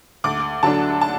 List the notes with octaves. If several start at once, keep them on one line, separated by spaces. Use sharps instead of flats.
D2 D6
D3 F#3 D4 A5
A5